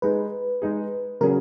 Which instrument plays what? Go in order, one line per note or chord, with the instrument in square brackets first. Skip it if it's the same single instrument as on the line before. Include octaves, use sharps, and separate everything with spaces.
[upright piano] G#3 D#4 G#4 [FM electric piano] B4
[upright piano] G#3 D#4 G#4
[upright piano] C#3 F#3 C#4 G#4 [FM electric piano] A#4